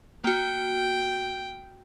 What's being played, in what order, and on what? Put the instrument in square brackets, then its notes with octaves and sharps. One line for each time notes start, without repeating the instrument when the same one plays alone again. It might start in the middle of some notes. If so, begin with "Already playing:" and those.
[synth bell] A#3 F#4 [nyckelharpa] G5